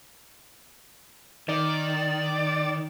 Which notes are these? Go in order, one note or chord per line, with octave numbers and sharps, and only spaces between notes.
D#3 D5